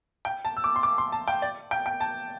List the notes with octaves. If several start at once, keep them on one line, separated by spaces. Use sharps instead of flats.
G5
A5
E6
D6
C6
D6
C6
A5
G5
D5
G5
G5
A5